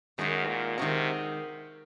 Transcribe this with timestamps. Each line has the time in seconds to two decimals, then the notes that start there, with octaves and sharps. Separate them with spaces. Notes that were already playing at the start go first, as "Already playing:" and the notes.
0.18 F#2 D#3 G#3 D#4 F#4 A#4
0.48 A#2
0.78 C3 D#3 G#3 D#4 F#4 A#4